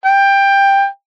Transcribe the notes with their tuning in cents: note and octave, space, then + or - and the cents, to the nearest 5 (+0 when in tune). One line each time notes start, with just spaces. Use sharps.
G5 +15